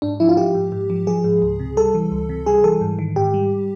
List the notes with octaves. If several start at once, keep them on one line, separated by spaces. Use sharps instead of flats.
G#2 D4
F3 E4
F4
F3 G4
G#2
G#2
F3
F3 G#4
G#2
C#2
C3
G3 A4
E3
C#2
C3
G3 G#4
E3 A4
G#2
D#3
G#2 G4
G3